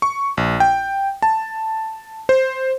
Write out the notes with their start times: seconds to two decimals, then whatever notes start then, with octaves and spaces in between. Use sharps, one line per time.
0.02 C#6
0.37 A#1
0.60 G5
1.22 A5
2.29 C5